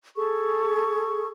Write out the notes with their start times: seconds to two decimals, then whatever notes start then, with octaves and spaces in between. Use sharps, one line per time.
0.16 G#4 A4 C#6